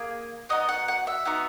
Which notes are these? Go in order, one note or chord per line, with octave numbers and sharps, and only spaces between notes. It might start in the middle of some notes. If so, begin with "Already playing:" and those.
Already playing: A#3 G#4
B3 D#4 F#4 D#5
F#5
F#5
E5
B3 D#4 F#4